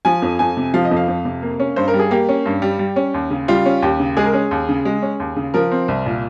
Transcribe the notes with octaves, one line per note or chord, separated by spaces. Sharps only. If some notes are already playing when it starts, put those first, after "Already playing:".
F3 G#5
F2
F2 G#5
C3
F3 F5
D#5
F2
F5
F2
C3
A#3
C#4
G2 C5
A#4
G3
G#4
A#3 G4
C#4
G2
G3
G3
C#4
D#2
C#3
G3 F4
C#4
D#2 G4
C#3
G#3 G#4
A#4
C#4 G#4
D#2
C#3
G#3
C#4
D#2
C#3
F3 A#4
C4
C2
A#2